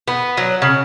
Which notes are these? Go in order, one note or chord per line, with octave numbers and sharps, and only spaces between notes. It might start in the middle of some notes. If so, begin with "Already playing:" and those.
B3
F#3
C#3